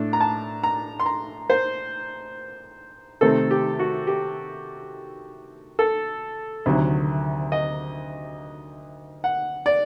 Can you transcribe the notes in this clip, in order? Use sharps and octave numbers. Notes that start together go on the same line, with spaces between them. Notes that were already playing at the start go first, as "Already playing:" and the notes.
Already playing: A2 A3 D4
A#5
A5
A#5
C6
A#5
C5
C3 D#3 A3 C4 A4
G4
F#4
G4
A4
D2 C3 D#3 F#3
D#5
F#5
D5